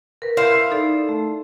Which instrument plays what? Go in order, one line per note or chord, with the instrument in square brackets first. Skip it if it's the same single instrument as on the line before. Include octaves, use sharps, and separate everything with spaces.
[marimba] A#4 B4
[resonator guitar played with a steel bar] E4 C5 F5
[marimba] D#4 A4 D5
A3